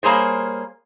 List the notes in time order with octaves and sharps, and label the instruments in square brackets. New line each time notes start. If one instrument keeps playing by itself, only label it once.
[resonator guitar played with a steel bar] G3 A#3 G#4 C5 C#5